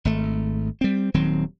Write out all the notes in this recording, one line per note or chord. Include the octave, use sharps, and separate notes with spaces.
G#1 A3
G3 C4
D#1 D#3 F#3 C4